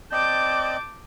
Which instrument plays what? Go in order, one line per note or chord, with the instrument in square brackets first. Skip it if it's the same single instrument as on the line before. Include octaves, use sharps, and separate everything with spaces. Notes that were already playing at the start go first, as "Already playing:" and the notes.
[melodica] C4 D5 D#5 [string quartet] A5 D6 G6